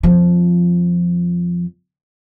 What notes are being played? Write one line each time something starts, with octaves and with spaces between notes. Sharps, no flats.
F2 F3